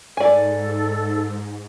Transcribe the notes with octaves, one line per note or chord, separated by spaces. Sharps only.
G#2 A4 D5 G#5